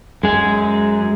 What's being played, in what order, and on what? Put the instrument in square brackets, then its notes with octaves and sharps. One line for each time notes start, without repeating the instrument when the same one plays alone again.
[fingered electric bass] F#2 [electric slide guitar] G#3 G#4